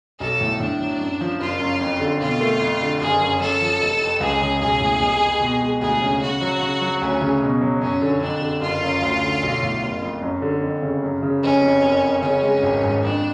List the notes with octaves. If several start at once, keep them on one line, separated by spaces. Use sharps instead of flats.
B1 A4
A2
A2 D4
F#3
F#2
F3
F#1 F4
F#2
F2
D3
B2 F4
A3
F2
D3
F#1 G#4
F#2
F#2 A4
F3
F1
F2
C#2 G#4
C#3
B1 G#4
A2
F1
F2
B2
G#3
D2 G#4
C#3
C#3 F#4
F#3
C#3
F#3
D2 C#4
C#3
B2
F#3
F#2 C#4
D3
F2 D4
D3
F#1 F4
F#2
D2
D3
B1
A2
F#1
F2
F#2
D3
F2
C#3
F#2
C#3
F1 C#4
F2
F#1
F2
C#3 C#4
G#3
G#1
G#2
F2 D4